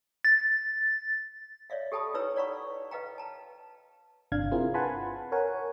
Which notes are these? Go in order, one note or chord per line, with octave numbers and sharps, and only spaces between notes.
A6
C#5 D5 E5 F5
G4 A4 G5 A5 B5 D#6
D#4 E4 B4 C#5 A#5 E6
C#5 D5 F#5 A#5 B5 C#6
B4 D#5 F5 G5 A#5
A5 A#5
G1 C3 D4 F5 G#6
C4 E4 F4 G#4 A#4
B4 F#5 G#5 A5 B5 C6
A#4 C#5 F#5 G#5